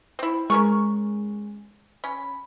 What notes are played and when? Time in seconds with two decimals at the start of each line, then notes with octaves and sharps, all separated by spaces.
0.19 C4 E4
0.50 G#3 C#4 A#4 C#6
2.04 C#4 B5